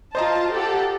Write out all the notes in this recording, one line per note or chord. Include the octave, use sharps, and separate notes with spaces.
F4 C5 D#5 A5 A#5
G4 A4 F#5